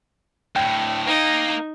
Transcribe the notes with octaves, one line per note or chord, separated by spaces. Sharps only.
D2 A2 G5
A#3 D#4